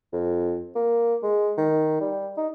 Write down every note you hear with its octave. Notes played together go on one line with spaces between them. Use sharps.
F2
A#3
G#3
D#3
G3
D#4